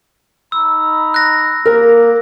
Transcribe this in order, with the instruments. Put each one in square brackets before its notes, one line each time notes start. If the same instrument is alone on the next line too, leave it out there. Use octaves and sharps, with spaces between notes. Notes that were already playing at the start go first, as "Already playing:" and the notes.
[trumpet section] D#4 A#5 B5 [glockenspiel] E6
[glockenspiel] F#6 A#6
[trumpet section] A#3 [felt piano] A#4